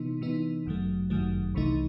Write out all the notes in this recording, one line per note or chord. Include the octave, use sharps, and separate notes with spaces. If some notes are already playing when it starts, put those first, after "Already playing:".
Already playing: C3 E3 B3 D#4
C3 E3 B3 D#4
G1 F#2 D#3 F#3 A3
G1 F#2 D#3 F#3 A3
C2 C3 E3 A3 D#4